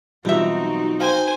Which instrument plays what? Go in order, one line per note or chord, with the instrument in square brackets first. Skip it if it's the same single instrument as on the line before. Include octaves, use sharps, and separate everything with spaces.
[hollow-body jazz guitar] B1 E5 [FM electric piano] E3 G3 F4 [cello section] C4 D#4 F#4
[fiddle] C5 G#5 [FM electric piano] F5 G5